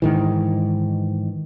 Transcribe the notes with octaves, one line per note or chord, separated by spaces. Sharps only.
G#2 D#3 E3